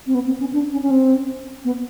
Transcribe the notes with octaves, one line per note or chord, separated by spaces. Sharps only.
C4
B3
C4
C#4
D4
C#4
C#4
C4
B3